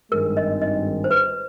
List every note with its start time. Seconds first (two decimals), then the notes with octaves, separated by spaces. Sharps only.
0.12 G#1 G2 D#3 G#3 A#4
0.37 D#5
0.62 D#5
1.04 C5
1.11 B4